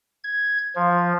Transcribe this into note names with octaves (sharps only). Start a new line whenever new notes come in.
G#6
F3